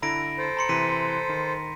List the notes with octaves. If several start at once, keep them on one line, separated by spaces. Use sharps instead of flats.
D3 E4 A#5 B5 A#6 D7
A4 C5
A#5 C6 C#7
C3 E3 B6 D#7
D#3